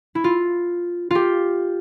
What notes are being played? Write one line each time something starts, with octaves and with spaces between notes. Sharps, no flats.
E4
F4
F4 G4